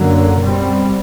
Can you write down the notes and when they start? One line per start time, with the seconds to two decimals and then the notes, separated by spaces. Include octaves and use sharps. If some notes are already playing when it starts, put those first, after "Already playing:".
Already playing: F#2 D3 F#3 A#3
0.41 B2 G3 C4